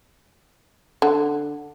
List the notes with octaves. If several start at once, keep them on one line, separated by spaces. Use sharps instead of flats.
D3